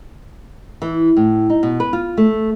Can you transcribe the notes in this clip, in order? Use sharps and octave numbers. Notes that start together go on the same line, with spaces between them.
E3
A2
D#4
B2
B4
F4
A3